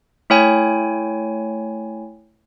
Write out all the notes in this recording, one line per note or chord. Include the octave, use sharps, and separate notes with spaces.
A3 E4 C#5 G5 G#5